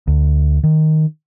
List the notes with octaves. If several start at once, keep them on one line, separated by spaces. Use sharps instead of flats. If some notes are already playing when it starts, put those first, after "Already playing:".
D2
D#3